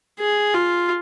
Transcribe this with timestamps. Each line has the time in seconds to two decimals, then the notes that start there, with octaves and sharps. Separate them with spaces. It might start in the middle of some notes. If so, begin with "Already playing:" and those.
0.20 G#4
0.54 F4